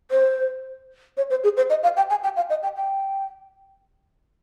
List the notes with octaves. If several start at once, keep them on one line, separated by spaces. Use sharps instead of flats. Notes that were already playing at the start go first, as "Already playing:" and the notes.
C5
C#5
C5
G#4
C5
D#5
F5
G5
G#5
G5
F5
D#5
G5
G5